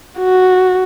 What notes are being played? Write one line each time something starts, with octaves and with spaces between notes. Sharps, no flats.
F#4